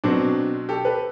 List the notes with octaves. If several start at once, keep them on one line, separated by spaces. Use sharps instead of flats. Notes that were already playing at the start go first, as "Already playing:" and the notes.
B2 F#3 C4 D4
G4 A4
A4 B4